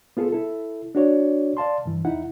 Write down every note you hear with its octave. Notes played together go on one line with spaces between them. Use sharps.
B3 F4 G#4 A4
E4 A4
D4 F#4 C#5 D5
D5 F5 A5 C6
G2 E3
E2 D#4 E4 F#5